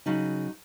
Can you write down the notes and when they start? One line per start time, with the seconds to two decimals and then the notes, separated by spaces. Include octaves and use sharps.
0.06 C#3 F#3 D#4